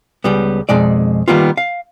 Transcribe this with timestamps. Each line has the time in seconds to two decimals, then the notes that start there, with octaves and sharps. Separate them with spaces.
0.24 C#2 G3 B3
0.69 F2 B2 G#3 D5
1.28 D#3 F3 G3 A#3 B3 F4
1.57 F5